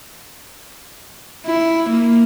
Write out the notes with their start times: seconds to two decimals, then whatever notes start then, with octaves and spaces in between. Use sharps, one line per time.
1.46 E4
1.90 A#3